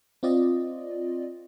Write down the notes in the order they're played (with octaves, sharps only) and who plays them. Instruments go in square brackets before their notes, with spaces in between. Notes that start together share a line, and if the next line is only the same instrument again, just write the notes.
[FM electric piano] C4 F4 D5 D#5